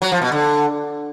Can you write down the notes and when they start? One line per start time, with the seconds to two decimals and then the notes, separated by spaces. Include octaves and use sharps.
0.02 F#3
0.12 F3
0.22 B2
0.32 D3